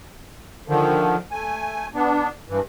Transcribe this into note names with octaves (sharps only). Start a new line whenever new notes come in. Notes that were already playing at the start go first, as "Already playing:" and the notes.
D3 D#3 F3
A3 G#5
B3 D4
G2 E3